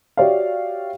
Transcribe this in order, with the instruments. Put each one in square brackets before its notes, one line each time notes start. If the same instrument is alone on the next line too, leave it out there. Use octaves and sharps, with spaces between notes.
[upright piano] F#4 G4 C#5 D5 E5 F5